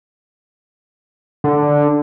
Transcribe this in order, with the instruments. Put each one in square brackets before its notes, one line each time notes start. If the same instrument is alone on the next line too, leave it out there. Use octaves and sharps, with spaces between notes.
[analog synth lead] D3